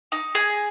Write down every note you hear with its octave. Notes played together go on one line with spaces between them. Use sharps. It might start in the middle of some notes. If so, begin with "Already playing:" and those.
D#4
G#4